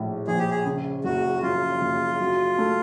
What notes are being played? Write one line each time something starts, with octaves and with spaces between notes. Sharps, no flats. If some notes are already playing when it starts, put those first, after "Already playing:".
Already playing: A#1 A2
A#1 G#4
G4
G#4
C#3
F#1 F#4
F#2 F4
F#1
F#3
A3